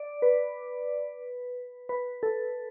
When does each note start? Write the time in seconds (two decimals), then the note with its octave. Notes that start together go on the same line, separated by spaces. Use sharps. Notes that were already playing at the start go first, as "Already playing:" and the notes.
Already playing: D5
0.22 B4
1.89 B4
2.23 A4